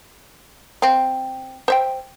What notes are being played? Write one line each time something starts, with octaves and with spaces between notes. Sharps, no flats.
C4 F5
C5 E5 G5